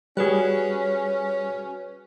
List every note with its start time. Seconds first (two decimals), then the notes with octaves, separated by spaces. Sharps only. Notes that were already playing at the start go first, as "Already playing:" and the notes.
0.17 G3 C#4 F#4 G#4 B4 F#6